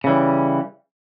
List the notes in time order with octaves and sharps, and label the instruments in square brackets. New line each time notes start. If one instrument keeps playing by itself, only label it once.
[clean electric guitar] C#3 E3 G3